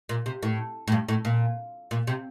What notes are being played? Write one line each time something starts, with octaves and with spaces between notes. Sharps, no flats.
A#2
C3
A2
A2
G2
A2
A#2
A#2
C3